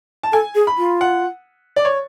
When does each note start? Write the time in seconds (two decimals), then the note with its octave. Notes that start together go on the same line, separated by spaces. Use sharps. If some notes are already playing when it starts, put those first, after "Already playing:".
0.23 A5
0.32 A4 G#5
0.55 G#4
0.67 B5
0.78 F4
1.01 F#5
1.76 D5
1.85 C#5